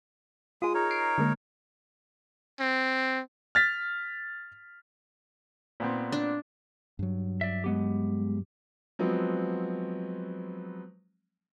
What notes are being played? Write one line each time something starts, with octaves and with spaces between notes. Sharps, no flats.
G#3 F4 G#4 D#6
D#4 A#4 C#5
C7 D7
D3 G#3 A#3
C4
F6 A6 B6
A#2 B3 C4
D4
G2 F#3
D5 E5
G#3 B3 G4
F3 F#3 G#3 B3 C4